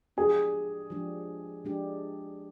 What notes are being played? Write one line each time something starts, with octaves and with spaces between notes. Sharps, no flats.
F3 G#3 D4 G4 G#4
F3 G#3 D4 G4
F3 G#3 D4 G4